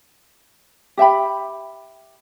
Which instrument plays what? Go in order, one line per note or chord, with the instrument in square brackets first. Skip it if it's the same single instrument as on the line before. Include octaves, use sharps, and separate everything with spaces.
[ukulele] G4 E5 G5 B5